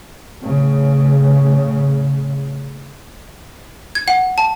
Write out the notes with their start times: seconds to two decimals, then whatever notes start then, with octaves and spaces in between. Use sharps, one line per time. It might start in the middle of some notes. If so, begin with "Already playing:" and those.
0.41 A2 C#3
3.95 G#6
4.08 F#5
4.38 A5